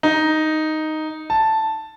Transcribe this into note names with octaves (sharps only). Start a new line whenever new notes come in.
D#4
A5